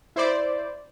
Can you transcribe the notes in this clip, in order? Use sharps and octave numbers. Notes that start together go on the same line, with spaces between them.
E4 C5 D5